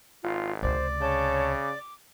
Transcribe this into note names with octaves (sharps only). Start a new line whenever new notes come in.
G#1 F4
C#2 C3 C5 D5
C#3 C#5 A5 G6
D6